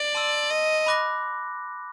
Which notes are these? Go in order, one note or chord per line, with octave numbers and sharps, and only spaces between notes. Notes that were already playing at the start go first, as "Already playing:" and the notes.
Already playing: D5
A5 C6 E6
D#5
B5 D6 F#6 A#6